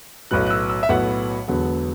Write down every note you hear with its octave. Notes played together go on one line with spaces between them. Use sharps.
B1 A2 F#3 B3 F#6
F#6
E6
E6
E5
B1 A2 F#3 B3 F#5
E1 E2 D3 F#3 B3